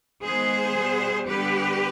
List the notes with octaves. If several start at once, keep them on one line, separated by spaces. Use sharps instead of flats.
D#3 G#3 B3 G#4 C5
B2 G3 B3
D3 G3 B3 G4 B4